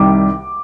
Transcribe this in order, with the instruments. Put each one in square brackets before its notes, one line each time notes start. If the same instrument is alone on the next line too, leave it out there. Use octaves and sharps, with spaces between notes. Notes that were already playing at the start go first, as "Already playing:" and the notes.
Already playing: [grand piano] C2 C3 D#3 G3 [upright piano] D6